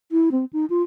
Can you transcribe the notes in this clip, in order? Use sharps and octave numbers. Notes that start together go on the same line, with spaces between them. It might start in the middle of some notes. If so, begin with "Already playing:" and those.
E4
C4
D#4
F4